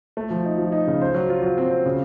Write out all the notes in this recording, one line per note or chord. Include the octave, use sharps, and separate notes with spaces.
A3
F3
D#4
F3
D#4
C#3
C5
F#3
F4
F#3
C4
C5
C#3